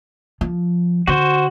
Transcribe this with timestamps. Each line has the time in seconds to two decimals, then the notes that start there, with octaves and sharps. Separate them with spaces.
0.41 F3
1.07 D3 F#4 C5